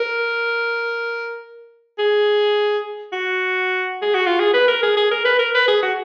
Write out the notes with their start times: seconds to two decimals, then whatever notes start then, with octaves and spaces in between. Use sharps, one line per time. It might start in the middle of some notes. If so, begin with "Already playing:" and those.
Already playing: A#4
1.99 G#4
3.13 F#4
4.02 G#4
4.14 F#4
4.26 F4
4.40 G#4
4.54 B4
4.68 A#4
4.83 G#4
4.97 G#4
5.11 A#4
5.25 B4
5.39 A#4
5.54 B4
5.68 G#4
5.83 F#4